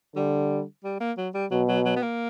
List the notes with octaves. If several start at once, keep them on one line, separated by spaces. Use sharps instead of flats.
D3 G3
G3
A#3
F#3
G3
B2 F#3
F#3
F#3
B3
A#3